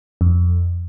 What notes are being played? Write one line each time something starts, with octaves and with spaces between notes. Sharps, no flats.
F2